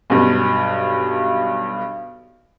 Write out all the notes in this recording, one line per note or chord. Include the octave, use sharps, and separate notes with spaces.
B1 G2